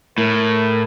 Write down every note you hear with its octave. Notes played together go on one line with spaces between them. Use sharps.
A2 A#4